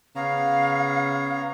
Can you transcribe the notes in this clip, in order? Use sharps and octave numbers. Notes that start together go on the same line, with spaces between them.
C#3 B3 C#5 F5 A#5